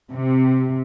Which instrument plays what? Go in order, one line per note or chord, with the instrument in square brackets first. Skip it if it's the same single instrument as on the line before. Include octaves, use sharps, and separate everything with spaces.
[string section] C3